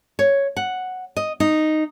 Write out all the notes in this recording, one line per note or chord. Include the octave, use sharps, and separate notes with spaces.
C#5
F#5
D#5
D#4